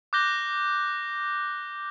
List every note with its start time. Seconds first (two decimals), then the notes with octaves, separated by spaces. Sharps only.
0.13 D6 F#6 G6 A#6 G7